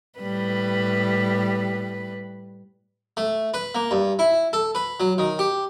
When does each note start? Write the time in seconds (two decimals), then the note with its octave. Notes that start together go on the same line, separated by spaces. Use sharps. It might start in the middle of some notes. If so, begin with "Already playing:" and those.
0.19 A2 G3 B4
3.17 A3
3.54 B4
3.75 A#3
3.91 G2
4.19 E4
4.53 A4
4.75 B4
5.00 F#3
5.18 D#3
5.39 G4